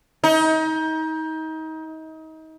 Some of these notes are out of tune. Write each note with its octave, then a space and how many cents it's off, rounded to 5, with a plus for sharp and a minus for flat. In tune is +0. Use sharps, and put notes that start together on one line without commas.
D#4 +30